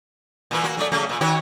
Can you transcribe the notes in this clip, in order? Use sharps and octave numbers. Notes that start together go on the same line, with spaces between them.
A#2 E3 A#3
A#3 F#4
F#3 A3 D5
C#3 F#3 A3
A#2
D#3 F#4 C#5